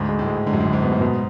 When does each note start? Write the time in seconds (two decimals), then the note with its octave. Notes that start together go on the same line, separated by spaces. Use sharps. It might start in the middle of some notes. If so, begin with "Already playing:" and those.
Already playing: D2 G#2
0.09 G#3
0.19 A2
0.27 G#3
0.46 G#2 D3
0.53 F#2
0.60 G#2
0.65 D2
0.73 G#2
0.83 B3
0.92 F#2
1.01 G#2 B2